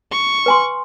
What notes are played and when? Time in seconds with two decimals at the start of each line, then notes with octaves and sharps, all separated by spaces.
0.12 C#6
0.46 B4 G#5 C6